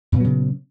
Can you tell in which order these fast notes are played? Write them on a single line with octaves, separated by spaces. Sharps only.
A#2 B3 F#3 C#3